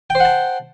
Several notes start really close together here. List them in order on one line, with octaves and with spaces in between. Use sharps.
G5 C5 F#5 A5